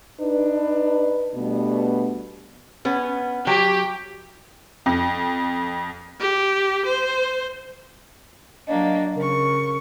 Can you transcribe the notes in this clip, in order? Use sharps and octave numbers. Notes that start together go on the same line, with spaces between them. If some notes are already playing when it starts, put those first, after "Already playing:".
D4 D#4 B4
B2 G3 A3 B3 D4
B3 C#4
F#3 G4
F2
G4
C5
F#3 A#3 D4 D#5
C#3 A#4 C#6